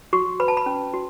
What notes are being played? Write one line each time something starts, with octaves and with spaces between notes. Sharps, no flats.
F#4 C#6
B4 B5
A5
B5
C#4
F#4